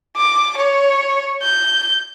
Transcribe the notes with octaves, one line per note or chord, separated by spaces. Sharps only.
D6
C#5
G6